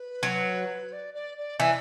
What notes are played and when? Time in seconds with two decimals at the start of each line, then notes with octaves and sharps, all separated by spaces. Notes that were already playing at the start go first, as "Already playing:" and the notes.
Already playing: B4
0.23 F#3
0.92 D5
1.14 D5
1.37 D5
1.60 E3 D5